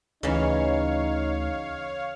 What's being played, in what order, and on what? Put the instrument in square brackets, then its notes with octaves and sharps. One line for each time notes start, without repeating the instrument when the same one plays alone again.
[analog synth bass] D2 [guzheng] C#3 E3 [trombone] D#4 [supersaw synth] C#5 F5